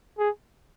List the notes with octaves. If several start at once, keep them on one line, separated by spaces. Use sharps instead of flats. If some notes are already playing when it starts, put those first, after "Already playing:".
G#4